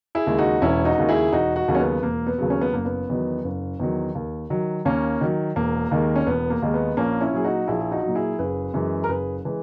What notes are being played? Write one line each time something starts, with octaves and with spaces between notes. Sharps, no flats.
E4 G#4
D#2 C#3 G#3
D#4 F#4
E1 C#4 E4
D#4 F#4
D#2 C#3 G#3
E4 G#4
E1 D#4 F#4
D#4 F#4
D#2 C#3 F#3
C#4
B3
E1 A#3
B3
D#2 C#3 F#3
C#4
B3
F#1 A#3
B3
E2 D#3 F#3
F#1
E2 D#3 F#3
D#2
D#3 F#3
D#2 A#3 C#4
D#3 F#3
E1 A#3
D#2 D#3 G#3
C#4
E1 B3
A#3
D#2 D#3 G#3
B3
A#1 A#3 C#4
C#4 E4
A#2 F#3 G#4
D#4 F#4
A#1 E4 G#4
G#4
D#4 F#4
A#2 F#3
E4 G#4
F#1 G#4 B4
F#2 E3 G#3
A#4
F#1 G#4 B4
E3 G#3